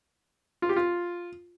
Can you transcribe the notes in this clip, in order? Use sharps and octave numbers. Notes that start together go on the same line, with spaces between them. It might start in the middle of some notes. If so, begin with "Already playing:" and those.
F4
G4
F4